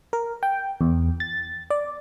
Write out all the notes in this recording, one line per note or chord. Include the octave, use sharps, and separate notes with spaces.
A#4
G5
E2
A6
D5